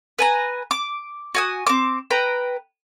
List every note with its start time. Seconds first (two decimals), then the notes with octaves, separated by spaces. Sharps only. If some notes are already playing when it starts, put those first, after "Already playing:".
0.19 B4 G#5 A#5
0.71 D6
1.35 F#4 G#5 D#6
1.67 C4 D6
2.10 B4 G5 A#5